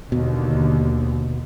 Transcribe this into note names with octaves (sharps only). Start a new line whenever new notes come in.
D#2 B2 D3